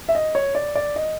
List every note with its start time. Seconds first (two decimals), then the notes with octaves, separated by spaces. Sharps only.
0.09 E5
0.15 D#5
0.35 C#5
0.55 D5
0.75 D5
0.96 D#5